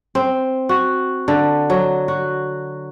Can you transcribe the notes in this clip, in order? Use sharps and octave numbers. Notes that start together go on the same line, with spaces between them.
C4
F#4
D3
F#3
F#4